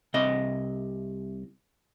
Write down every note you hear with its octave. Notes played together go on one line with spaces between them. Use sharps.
C2 C3 D#5